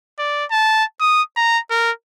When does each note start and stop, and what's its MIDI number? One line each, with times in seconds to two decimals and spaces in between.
0.19 0.45 74
0.51 0.84 81
1.00 1.22 87
1.36 1.59 82
1.70 1.91 70